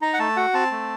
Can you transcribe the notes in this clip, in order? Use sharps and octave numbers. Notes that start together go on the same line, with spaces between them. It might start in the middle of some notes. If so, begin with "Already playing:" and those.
D#4 A#5
F#5
A3 A5
F#4 F#5
C4 A5
A3